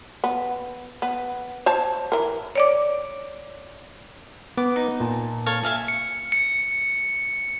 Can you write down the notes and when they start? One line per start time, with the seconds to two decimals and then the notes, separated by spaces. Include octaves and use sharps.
0.24 B3
1.02 B3
1.66 C5 C#5 A5
2.12 E3 A#4
2.55 C#5 D5 D6
4.57 B3 D6
4.76 D#4
5.00 A#2 A5
5.46 A4 C#5 F5
5.63 E5 F5 G#5
5.88 C#7
6.32 C#7